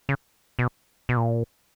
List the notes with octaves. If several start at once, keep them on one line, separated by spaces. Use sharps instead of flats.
C#3
B2
B2
A#2